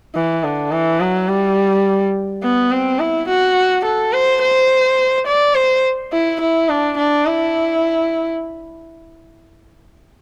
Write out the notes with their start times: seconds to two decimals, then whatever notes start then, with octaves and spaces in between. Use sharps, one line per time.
0.15 E3
0.44 D3
0.71 E3
1.00 F#3
1.28 G3
2.43 B3
2.71 C4
2.99 E4
3.28 F#4
3.85 A4
4.12 C5
4.42 C5
5.27 D5
5.54 C5
6.12 E4
6.41 E4
6.69 D4
6.97 D4
7.26 E4